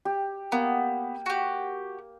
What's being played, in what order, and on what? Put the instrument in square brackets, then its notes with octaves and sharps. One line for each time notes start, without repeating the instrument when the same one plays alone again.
[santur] G4
[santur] A#3 [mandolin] B3
[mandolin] F#4 G4